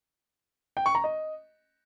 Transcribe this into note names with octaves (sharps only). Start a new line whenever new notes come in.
G5
C#6
A#5
D#5